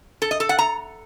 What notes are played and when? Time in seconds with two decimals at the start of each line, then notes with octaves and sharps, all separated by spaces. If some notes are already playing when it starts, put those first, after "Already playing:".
0.22 A4
0.31 D#5
0.40 A4
0.49 F#5
0.59 A#5